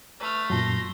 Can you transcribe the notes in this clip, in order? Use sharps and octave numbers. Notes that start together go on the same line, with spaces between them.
A3 B4 F6
F#2 A#2 F#3 A5 C6 A#6